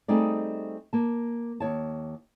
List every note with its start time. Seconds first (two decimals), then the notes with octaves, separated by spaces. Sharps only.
0.08 G3 A3 C4 D#4 G#4 D5
0.93 A#3 A5
1.60 D#2 C#5 A5